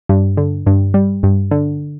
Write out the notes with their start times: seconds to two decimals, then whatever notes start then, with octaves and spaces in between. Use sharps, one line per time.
0.09 G2
0.37 D3
0.66 G2
0.94 G3
1.23 G2
1.51 D3